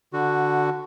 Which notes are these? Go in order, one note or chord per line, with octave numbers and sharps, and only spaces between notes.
D3 F#4